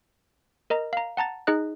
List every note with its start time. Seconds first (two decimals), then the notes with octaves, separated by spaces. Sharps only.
0.70 A#4 D#5 A#5
0.93 F5 A#5
1.17 F#5 A5 A#5 A6
1.47 D#4 G#4 D#5 F#6